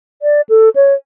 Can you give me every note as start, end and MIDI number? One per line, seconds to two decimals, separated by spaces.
0.22 0.41 74
0.49 0.69 69
0.75 0.94 73